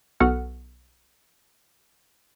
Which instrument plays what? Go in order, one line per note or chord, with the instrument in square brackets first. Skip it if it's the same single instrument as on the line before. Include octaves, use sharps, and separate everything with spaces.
[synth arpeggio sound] B1 B3 F#4 A4 F#5 F6